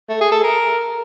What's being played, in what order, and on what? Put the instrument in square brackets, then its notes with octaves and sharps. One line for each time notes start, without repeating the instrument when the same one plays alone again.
[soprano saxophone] A3
G#4
A4
A#4